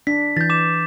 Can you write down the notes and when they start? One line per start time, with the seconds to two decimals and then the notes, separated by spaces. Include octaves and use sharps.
0.07 D4 B6
0.37 E3 G6 A6
0.50 D6 E7